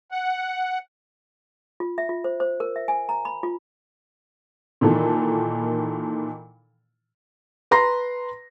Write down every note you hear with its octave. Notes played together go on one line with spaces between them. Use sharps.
F#5
F4
E5
F4
C5
C5
A#4
E5
G#5
A#5
B5
F4
A#2 D#3 E3 A4
B4 A#5 C6 A#6